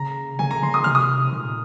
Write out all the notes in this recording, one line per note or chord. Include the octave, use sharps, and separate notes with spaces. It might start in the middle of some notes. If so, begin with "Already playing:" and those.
Already playing: C#3 A#5
C#3 G#5
A#5
C#3 C6
D#6
C3 F6
D#6
A#2